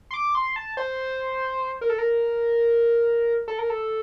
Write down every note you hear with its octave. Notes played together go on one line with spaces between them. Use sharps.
C6
D6
C6
A5
C5
A#4
A4
A#4
A4
A#4
A4